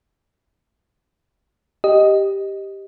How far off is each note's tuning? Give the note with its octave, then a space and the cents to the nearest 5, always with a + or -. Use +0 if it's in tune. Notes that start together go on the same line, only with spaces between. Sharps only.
G4 +0 D#5 +0